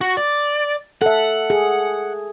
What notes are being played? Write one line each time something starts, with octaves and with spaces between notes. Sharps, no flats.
F#4
D5
A4 E5 F#5
G#4